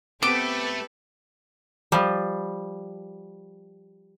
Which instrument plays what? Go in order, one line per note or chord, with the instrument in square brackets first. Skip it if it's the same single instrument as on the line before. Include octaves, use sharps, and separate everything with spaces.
[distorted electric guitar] A3 [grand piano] B3 C4 [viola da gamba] G4 A4 B4 [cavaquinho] D6
[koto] F3 G3